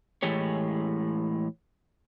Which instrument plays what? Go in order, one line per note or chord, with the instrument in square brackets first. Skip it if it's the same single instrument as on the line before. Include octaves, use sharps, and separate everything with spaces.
[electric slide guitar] A2 E3 G#3 G4 C#5